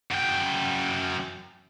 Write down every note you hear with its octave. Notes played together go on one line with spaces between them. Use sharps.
F#2 G5